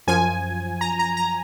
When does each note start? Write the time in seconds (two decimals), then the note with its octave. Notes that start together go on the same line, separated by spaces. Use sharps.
0.07 F#2 F3 G#5
0.81 A#5
0.99 A#5
1.17 A#5